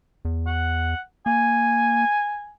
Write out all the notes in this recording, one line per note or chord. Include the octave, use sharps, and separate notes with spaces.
E2
F#5
A#3 G#5